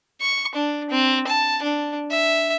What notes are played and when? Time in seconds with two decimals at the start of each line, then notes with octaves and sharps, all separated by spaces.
0.21 C#6
0.55 D4
0.90 C4
1.27 A5
1.63 D4
2.11 E5